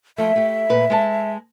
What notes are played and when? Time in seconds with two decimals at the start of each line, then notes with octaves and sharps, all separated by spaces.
0.18 F3 A3 E5
0.36 A3 G4
0.69 A#2 B4
0.90 G#3 D5 A5